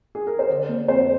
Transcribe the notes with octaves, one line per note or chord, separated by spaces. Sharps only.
G#4
A#4
C5
D3 D5
A#3 D5
F2 C5